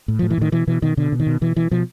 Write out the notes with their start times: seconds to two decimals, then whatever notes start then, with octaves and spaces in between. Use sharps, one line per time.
0.08 A2
0.19 F3
0.22 A2
0.30 E3
0.38 A2 D#3
0.52 B2 E3
0.67 B2 E3
0.82 B2 D#3
0.97 B2 D3
1.12 B2
1.20 D#3
1.27 B2
1.41 B2 E3
1.57 B2 E3
1.71 B2 F3